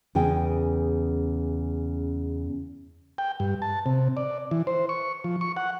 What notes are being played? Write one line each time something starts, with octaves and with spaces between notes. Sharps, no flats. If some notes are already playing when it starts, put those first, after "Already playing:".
E2 C#3 G#4 G5
G5
G2
A5
C3
D5
E3
C5
C#6
F3
C#6
F#5